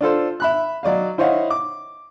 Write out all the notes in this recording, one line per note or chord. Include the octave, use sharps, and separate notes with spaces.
D4 F4 A4 C5
E5 B5 F#6
F#3 D5 D#5 F5
E4 C5 C#5 D#5 F5 F#5
D6